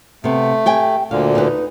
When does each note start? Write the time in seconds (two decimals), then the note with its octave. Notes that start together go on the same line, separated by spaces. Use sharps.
0.24 C3 A3 B3
0.66 G4 G5 G#5
1.11 D2 A#2 D3 F5
1.35 D#4 B4